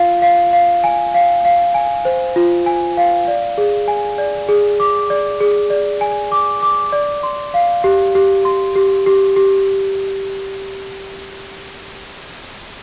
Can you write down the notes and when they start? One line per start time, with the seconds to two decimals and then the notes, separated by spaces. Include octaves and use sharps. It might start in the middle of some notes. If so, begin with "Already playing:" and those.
Already playing: F4 F5
0.22 F5
0.53 F5
0.84 G#5
1.14 F5
1.45 F5
1.74 G#5
2.05 C5
2.36 F4
2.66 G#5
2.97 F5
3.28 D5
3.58 G#4
3.88 G#5
4.18 D5
4.49 G#4
4.80 D6
5.10 D5
5.40 G#4
5.70 D5
6.01 G#5
6.32 D6
6.63 D6
6.92 D5
7.23 C6
7.54 F5
7.84 G4
8.15 G4
8.45 C6
8.76 G4
9.06 G4
9.36 G4